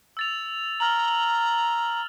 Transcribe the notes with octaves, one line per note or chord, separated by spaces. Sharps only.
E6 A6 F7
A#5 F6 F#7